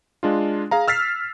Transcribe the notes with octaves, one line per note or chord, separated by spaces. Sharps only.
G#3 D4 F4
G#4 F5 A#5
E6 F6 A6 B6 C7